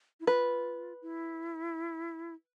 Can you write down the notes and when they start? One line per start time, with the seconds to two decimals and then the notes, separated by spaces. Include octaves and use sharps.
0.20 E4
0.27 F4 B4
1.02 E4